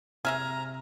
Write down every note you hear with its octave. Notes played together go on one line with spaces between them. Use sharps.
C3 G#3 E5 G#5 A#5 F6